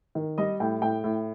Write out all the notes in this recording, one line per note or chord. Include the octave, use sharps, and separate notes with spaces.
D#3
G3 D#5
A2 G5
A2 G5
A2